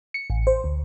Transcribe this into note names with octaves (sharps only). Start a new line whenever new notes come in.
C#7
A1
C5
D2